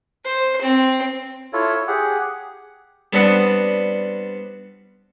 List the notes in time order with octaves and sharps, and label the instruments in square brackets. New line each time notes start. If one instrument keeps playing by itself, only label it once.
[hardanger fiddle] C5
C4
[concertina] E4 F4 A4 C#5
C#5
G4 G#4 F#5
[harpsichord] G3 B3 C4 D4 F#5 D#6